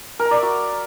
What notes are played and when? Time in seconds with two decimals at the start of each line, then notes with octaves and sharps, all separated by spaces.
0.19 A#4
0.25 A#5
0.31 D5
0.37 E5
0.43 F#4